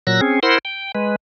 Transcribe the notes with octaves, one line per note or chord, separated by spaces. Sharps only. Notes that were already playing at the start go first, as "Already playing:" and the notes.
A#2 F#3 E6 F#6 A#6
C4 C#4 G#4
E4 A#4 C5 F#5 C6
G5
G#3 B4